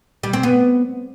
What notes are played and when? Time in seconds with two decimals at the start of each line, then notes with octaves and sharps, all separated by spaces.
0.23 G3
0.33 C4
0.43 B3